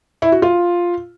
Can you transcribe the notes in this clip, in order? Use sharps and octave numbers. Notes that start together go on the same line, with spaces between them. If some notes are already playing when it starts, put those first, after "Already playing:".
E4
F#4
F4